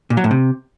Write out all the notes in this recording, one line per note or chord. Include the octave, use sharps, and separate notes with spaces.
A#2
F#3
A2
C3